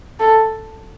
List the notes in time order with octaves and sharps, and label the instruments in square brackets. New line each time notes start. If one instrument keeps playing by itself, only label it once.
[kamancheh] A4